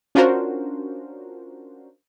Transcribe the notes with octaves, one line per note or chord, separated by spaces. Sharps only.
C#4 D4 F4 F#4 A#4 C5